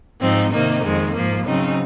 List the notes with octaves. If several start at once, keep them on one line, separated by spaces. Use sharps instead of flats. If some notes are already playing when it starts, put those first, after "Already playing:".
G#2 F3 C4 D#4
C3 D#3 A#3 D#4
F2 D#3 G#3
G#2 F3 A#3
C#3 F#3 C4 D#4